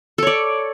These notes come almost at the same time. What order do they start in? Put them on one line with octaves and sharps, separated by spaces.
A4 C#5 D5